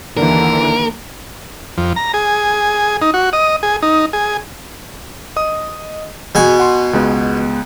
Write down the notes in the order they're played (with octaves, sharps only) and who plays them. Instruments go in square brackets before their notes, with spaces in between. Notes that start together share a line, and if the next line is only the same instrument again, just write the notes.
[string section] D#2 [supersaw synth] D3 E3 [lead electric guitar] A#4
[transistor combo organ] F2
A#5
G#4
D#4
F#4
D#5
G#4
D#4
G#4
[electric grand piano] D#5 D#6
[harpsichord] B2 G#5 [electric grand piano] G#4
[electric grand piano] F#5 C6
C#2 G#3 B3